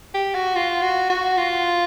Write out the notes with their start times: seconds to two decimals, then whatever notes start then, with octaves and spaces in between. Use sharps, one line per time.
0.14 G4
0.35 F#4
0.56 F4
0.82 F#4
1.10 F#4
1.37 F4